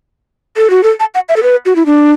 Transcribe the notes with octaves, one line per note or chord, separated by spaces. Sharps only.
A4
F#4
A4
A5
F#5
E5
A4
B4
F#4
E4
D4